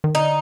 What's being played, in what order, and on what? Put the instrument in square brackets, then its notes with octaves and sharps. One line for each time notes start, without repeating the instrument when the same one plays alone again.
[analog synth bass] D#3
[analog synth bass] D3 [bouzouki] D#4